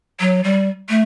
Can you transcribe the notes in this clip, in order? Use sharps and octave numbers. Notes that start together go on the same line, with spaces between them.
F#3
G3
A3